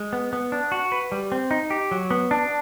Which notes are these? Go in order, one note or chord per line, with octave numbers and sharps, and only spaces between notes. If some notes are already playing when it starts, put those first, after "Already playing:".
Already playing: G#3
B3
B3
D4
F#4
B4
G3
C4
D#4
G4
F#3
B3
D4